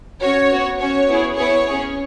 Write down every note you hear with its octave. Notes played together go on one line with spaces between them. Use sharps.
C#4 F#4 C#5
B3 F#4
C#4 F#4 C#5
B3 E4 G#4
B3 E4 G#4 C#5
C#4 G#4